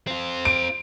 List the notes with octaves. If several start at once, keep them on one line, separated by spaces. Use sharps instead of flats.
C4 F4
D7